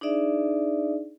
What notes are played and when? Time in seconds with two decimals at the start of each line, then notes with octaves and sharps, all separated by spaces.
0.01 D4 D#4 G#4 D5 E5